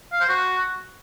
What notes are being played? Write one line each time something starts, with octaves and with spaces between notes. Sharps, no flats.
F5
C5
F#4